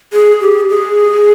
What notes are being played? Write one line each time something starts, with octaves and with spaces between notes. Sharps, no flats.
G#4
G4
G#4